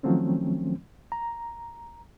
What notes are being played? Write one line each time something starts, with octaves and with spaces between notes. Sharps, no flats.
D#3 F3 F#3 A3 C4 C#4
A#5